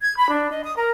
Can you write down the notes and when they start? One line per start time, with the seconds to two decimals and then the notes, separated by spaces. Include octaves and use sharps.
0.01 G#6
0.16 B5
0.31 D4
0.50 D#5
0.63 D#6
0.76 A#4